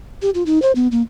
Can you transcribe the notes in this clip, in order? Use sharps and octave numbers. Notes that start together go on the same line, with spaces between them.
G4
F4
D#4
C5
B3
A#3